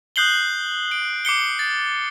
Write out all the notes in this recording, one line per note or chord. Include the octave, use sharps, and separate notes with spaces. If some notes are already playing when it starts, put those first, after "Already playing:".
D#6 F#6 G6 C7 F#7 G7
D7
D6 C7 C#7 G7
A6